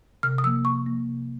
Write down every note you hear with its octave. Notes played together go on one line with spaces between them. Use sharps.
C3 F6
D#6
F3 A#3 E6
C3 C#6
F3 A#3
C3